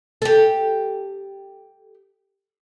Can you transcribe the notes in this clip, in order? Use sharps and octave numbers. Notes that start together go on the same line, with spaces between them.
G4 A4